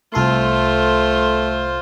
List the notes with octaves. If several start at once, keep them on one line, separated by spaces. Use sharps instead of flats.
C2 A3 F4 A4 C5 C6